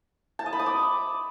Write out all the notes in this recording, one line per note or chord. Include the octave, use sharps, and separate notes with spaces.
A5
D#5
B5
D#6
D6